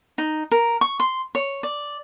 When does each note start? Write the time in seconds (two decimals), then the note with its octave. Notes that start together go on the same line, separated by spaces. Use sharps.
0.18 D#4
0.52 A#4
0.81 C#6
1.00 C6
1.35 C#5
1.63 D5